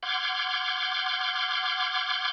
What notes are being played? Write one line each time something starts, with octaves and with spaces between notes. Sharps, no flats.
F#5 C6 D6 F6 G6 G#6